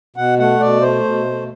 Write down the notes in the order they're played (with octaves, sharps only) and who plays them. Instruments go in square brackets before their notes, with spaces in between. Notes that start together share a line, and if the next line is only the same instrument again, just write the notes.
[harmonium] B2 F#5
A3 F#5
B2 D5
A3 C5
B2
A3